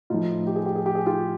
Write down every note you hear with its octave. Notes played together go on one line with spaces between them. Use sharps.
A2 F3 D#4 F4
G4
G#4
G4
G#4
G4
G#4
F4 G4